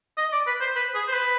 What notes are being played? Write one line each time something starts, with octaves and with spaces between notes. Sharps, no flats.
D#5
D5
B4
C5
B4
G#4
C5
B4